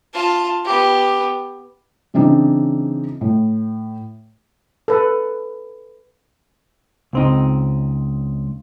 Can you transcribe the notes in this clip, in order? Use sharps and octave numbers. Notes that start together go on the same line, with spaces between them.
F4 A5
B3 G4
C#3 E3 C4 D4 D#4
A2
A4 B4
C#2 C4 D#4